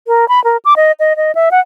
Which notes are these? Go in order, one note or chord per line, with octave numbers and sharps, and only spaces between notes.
A#4
B5
A#4
D6
D#5
D#5
D#5
E5
F#5